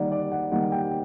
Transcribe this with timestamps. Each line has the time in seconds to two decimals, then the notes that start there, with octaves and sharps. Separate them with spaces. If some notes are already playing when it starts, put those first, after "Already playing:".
Already playing: D#3 G3 A#3 D5 F#5
0.12 D5
0.32 F#5
0.52 D#3 G3 A#3 F#5
0.72 G5